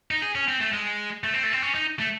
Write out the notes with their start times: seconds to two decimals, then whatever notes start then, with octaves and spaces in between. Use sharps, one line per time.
0.11 D#4
0.22 G#4
0.35 C#4
0.48 C4
0.60 A3
0.73 G#3
1.24 A3
1.34 C4
1.43 A3
1.53 C4
1.62 C#4
1.75 D#4
1.99 A3